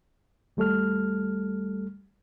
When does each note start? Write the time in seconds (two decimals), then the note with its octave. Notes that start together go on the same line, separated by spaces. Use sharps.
0.57 D#2 G3 A3 A4 F6